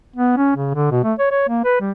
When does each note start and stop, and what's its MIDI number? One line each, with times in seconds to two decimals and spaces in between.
0.16 0.35 59
0.37 0.54 61
0.56 0.71 49
0.74 0.90 50
0.91 1.01 47
1.04 1.13 57
1.19 1.28 73
1.31 1.44 73
1.48 1.62 58
1.65 1.78 71
1.80 1.91 55